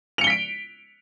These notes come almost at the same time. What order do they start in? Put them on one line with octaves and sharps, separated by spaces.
F7 C#7 G7 B6 D7